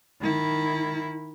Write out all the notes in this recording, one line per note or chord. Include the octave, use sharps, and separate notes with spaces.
D#3 E4